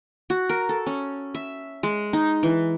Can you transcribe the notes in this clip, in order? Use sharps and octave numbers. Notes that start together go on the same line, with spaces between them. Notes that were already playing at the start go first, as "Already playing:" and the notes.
F#4
A#4
A4
C#4
E5
G#3
D#4
E3